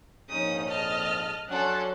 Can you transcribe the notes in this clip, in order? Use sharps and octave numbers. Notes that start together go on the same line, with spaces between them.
A#1 F2 G#2 C#4 D#4 D#6
D#5 A5 F6
F#3 C#4 D4 A4 F#5 C6